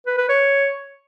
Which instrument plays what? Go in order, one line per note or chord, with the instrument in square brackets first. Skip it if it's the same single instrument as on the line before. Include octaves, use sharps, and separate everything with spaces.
[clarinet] B4
B4
C#5